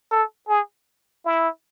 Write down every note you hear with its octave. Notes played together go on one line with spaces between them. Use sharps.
A4
G#4
E4